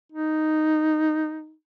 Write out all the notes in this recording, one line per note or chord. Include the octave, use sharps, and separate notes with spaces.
D#4